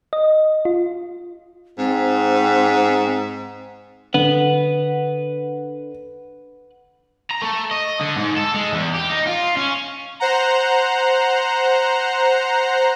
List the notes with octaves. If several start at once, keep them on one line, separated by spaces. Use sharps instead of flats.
D#5
F4
G#2 C4
D3 B4 F#5
A#5
A3
D#5
D3
G#2
A4
G#3
E2
G4
D#4
F4
C#4
C5 F#5 A#5